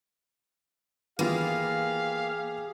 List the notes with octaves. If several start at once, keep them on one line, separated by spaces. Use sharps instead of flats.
E3 A#3 B3 F4 G4 G#4 F5